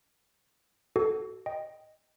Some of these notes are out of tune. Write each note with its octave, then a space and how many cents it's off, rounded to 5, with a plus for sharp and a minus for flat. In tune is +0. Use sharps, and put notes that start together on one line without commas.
F#4 +35 A4 -10
D#5 +0 G5 +0